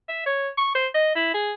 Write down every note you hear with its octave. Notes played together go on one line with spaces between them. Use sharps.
E5
C#5
C#6
C5
D#5
E4
G#4